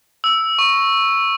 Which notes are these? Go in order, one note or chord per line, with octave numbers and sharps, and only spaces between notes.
E6
C#6